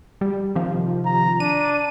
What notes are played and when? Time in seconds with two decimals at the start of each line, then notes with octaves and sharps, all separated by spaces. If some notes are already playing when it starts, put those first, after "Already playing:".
0.21 G3
0.55 C3 D#3 F3
1.05 A#5
1.40 D4 D#7